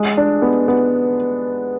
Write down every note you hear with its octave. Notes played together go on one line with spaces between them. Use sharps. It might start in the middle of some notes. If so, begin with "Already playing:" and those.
Already playing: G#3
D4
B3
B3